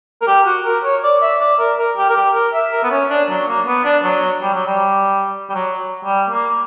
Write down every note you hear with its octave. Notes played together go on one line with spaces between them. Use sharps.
A#4
G4
F#4
A#4
C#5
D5
E5
D5
A#4
A#4
G4
A#4
G4
A#4
E5
A#4
B3
C#4
D4
F#3
A#3
B3
D4
F#3
G3
F#3
G3
G3
F#3
G3
A#3